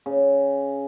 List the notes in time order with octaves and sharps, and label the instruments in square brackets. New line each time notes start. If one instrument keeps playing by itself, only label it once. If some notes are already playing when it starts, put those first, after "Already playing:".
[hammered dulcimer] C#3